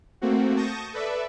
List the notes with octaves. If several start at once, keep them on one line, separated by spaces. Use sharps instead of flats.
A3 A#3 C4 F#4
A5 C#6 D#6 G6 A#6
A4 B4 D5 E5